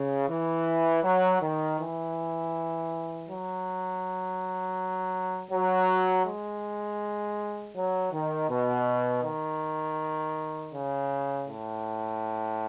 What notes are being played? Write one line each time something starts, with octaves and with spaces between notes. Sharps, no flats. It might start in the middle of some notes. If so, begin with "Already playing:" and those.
Already playing: C#3
E3
F#3
D#3
E3
F#3
F#3
G#3
F#3
D#3
B2
D#3
C#3
A2